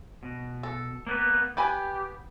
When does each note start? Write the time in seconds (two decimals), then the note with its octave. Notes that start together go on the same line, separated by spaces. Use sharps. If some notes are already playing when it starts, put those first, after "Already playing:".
0.23 B2
0.63 A4
1.07 A#3 B3 B4
1.57 B3 G4 B4 G#5